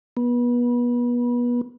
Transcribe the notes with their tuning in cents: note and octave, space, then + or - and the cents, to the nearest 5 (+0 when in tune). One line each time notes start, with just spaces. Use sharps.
B3 -30